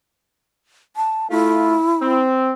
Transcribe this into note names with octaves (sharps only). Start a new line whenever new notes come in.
A5
A3 E4 F4
C4